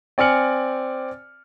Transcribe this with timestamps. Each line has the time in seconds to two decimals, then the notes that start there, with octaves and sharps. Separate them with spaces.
0.18 C4 D5 G#5 F6 C#7 F#7